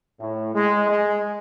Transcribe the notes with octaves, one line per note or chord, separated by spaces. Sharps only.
A2
G#3
G#3